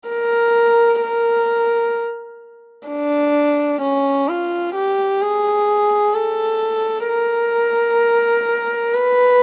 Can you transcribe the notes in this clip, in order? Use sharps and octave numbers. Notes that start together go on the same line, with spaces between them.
A#4
A#4
D4
C#4
F4
G4
G#4
A4
A#4
B4